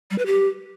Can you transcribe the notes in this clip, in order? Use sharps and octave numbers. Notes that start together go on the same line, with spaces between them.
G3
B4
G4